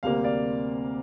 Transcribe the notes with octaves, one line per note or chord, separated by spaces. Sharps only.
D2 C3 G3 A#3 F5
D5 F5